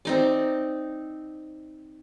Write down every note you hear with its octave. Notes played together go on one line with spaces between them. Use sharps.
C4 D#4 D5